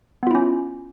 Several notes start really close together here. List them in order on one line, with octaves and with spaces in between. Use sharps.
B3 F4 E4 C#4